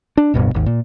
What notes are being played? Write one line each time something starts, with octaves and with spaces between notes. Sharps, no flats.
D4
D1 G2 B2
G#1 D#2
A#2